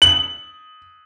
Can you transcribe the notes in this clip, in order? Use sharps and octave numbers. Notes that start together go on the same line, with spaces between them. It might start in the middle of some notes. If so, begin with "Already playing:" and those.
F#7